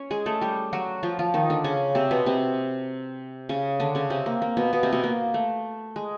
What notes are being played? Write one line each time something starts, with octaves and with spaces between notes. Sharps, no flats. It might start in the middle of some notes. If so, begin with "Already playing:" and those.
Already playing: C#4 C#5
G#3 G#4
A3 A4
G3 G4
F#3 F#4
F3 F4
F3 F4
D#3 D#4
D3 D4
C#3 C#4
C3 C4
B2 B3
C3 C4
C#3 C#4
D3 D4
C#3 C#4
C3 C4
A#3
A#3
B2 B3
B2 B3
C3 C4
B2 B3
A#3
A3
G#3